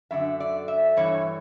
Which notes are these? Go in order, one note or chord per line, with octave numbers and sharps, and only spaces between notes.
F#2 D3 E5
D5
E5
G2 E3 C#5